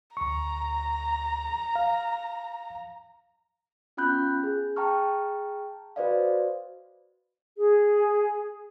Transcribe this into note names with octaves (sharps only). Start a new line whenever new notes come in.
D2 A#5 C#6
F5
B3 C#4 F4 B5 F#6 G6
G#4
G#4 G5 A5 A#5 C#6 F6
F#4 B4 C5 D5 D#5 F5
G#4